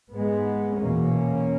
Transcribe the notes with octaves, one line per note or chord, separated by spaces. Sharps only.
G#2 G#3 B3
E2 B2 A#3 C#4